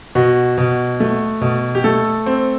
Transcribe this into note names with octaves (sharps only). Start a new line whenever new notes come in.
B2 F#4
B2
A3
B2
G4
A3 A4
C4